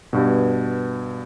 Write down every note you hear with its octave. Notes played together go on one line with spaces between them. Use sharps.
G2 B2